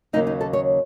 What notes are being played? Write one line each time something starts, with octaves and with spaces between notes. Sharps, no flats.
D#2 C#3 F#3 A#3 D#4
D#4
A4
C#5